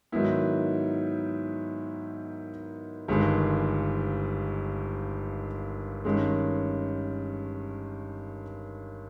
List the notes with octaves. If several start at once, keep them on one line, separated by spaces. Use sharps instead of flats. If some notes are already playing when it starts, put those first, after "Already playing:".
G#2 D#3 F#3 B3 E4
G1 G2 D#3 G#3
G2 D#3 G#3 C#4